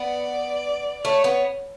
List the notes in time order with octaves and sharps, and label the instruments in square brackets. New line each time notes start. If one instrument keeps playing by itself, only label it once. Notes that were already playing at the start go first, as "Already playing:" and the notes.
Already playing: [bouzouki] B3 [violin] D5
[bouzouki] A3 [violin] C#5
[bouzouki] B3